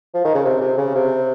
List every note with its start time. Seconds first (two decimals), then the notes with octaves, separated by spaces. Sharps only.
0.14 F3
0.25 D#3
0.35 C#3
0.45 C3
0.61 C3
0.78 C#3
0.95 C3